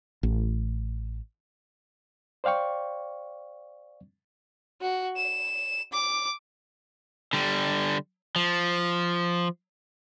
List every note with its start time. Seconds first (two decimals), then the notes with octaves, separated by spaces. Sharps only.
0.23 A1
2.44 C5 D5 F5 G5 C#6
4.81 F#4
5.17 E7
5.92 D6
7.33 D3 G3
8.36 F3